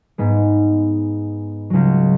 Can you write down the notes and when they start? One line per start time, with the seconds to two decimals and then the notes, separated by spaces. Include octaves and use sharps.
0.18 G#2 G#3 B3
1.70 C#2 C#3 F#3